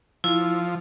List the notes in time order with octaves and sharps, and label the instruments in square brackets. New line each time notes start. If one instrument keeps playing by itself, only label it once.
[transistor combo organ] F3 [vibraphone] E4